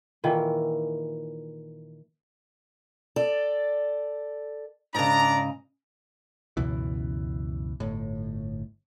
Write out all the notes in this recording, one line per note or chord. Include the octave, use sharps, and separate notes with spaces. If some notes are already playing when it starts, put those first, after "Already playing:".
A#2 D#3 E3
A4 D5
G#2 C#3 D4 D5 A#5
C#2 F#2 B2 E3
G1 A2